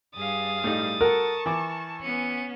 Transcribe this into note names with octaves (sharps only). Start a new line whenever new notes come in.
G2 G#4 F5 D#6 A6
A2 G3 D#4
F#4 A4 A#4 A5 C#6
E3 D6
B3 C#4 C#7 D#7